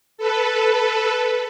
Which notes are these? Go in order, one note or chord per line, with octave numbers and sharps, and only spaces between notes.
A4 B4